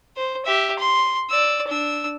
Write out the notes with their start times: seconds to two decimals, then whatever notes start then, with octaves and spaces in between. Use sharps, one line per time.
0.16 C5
0.45 G4 E5
0.79 C6
1.30 D5 E6
1.68 D4 E6